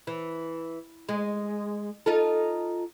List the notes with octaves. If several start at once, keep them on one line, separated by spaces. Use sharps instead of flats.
E3
G#3
D#4 F4 A4